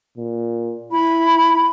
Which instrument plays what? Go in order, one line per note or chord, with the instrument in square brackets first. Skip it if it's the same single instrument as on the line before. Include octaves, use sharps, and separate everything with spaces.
[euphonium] A#2
[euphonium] E4 [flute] B5